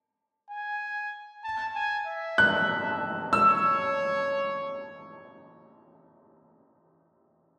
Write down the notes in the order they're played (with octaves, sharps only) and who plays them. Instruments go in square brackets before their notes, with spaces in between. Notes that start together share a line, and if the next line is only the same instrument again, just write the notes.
[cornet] G#5
A5
G#5
E5
[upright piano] F#6
[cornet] C#5 [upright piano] E6